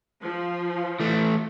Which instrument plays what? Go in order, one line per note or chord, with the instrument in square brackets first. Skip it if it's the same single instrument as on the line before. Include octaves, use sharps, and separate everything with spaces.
[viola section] F3
[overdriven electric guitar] E3 A3